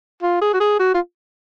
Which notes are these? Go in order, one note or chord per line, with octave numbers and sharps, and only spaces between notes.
F4
G#4
F#4
G#4
F#4
F4